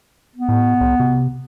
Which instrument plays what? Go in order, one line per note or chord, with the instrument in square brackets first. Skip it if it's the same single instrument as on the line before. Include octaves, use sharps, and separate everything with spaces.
[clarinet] B3
[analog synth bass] A2
C2
C3